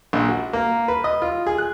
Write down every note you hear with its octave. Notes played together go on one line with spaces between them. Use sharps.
A#1
F#4
A#3
B4
D#5
F4
G#4
F#6